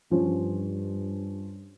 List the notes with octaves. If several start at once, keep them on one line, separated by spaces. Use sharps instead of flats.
G2 F3 C#4